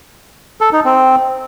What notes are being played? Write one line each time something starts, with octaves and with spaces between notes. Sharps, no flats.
A4
D#4
C4